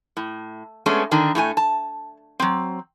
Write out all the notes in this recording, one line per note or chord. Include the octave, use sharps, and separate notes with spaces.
A2
G#3 A3 B3 C#4 D4
D3 D#3 D4
A2 A3 G#4 G#5
A5
F#3 C4